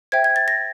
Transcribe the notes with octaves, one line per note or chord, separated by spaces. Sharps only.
C5 E5 G5 G#6
G#6
A6
A#6